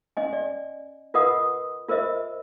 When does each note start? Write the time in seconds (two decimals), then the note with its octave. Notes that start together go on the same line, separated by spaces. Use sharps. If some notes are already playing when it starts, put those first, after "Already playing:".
0.17 C#4 D#5 G#5
0.33 D5
1.14 F4 A#4 B4 D#5 F#5 D#6
1.88 F4 A#4 C5 D#5 E5